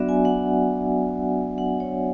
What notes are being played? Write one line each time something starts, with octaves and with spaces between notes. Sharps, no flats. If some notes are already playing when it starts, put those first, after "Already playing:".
Already playing: F#3 B3 D4 F#4 D5 E5
G#5
F#5
F#5
C#5